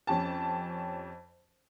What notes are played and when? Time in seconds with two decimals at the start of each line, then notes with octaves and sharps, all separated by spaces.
0.07 F2 C#4 G4 A5